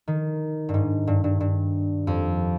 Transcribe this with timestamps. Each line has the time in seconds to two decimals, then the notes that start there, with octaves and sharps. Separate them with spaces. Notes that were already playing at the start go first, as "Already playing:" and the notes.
0.08 D#3
0.69 G2
0.74 G#2
1.07 G2
1.24 G2
1.40 G2
2.07 F2